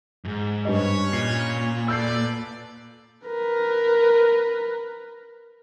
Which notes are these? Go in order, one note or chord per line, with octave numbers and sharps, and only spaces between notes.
F2 G#2
G2 C#4 G4 B4 C#5 D#5
A#2 C7
A4 B4 D5 E6 G6 C7
A#4 B4